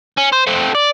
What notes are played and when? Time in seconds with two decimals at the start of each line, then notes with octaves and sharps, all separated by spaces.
0.17 C#4
0.32 C5
0.47 A3 C4
0.75 D5